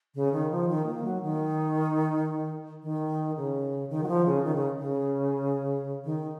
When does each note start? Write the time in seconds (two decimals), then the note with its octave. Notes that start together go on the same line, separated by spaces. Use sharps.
0.15 C#3
0.33 D#3
0.51 F3
0.69 D#3
0.86 A#3
1.05 F#3
1.22 D#3
2.83 D#3
3.37 C#3
3.90 D#3
4.04 F#3
4.08 F3
4.26 C#3
4.44 D#3
4.55 C#3
4.79 C#3
6.05 D#3